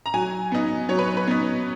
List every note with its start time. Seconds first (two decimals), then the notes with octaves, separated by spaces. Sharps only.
0.06 A#5
0.14 F#3 G#5
0.52 B3 D#4
0.89 F#3 C#5
0.99 B4
1.17 B4
1.27 B3 D#4